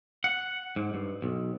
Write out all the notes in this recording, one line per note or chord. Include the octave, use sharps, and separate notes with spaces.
F#5
G#2
G2
B1